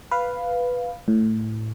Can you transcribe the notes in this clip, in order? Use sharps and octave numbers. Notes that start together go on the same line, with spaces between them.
B4 F5
A2